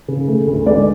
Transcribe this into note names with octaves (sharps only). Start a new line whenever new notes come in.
C#3
A3
D2
G#3 D5